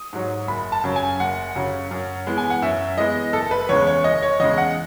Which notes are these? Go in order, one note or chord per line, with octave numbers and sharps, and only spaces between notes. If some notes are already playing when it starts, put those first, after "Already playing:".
Already playing: D#6
G#2 F#3
F#1 B5
A5
F#2 C#3 F#3
G#5
F#1 F#5
F#2 C#3 F#3
F#2
E3 G#3 B3
G#5
F#5
F#2 E5
E3 G#3 B3 D#5
F#1 A4
B4
E2 C#3 G#3 C#5
C#5
F#1 D#5
C#5
E2 C#3 G#3 D#5
F#5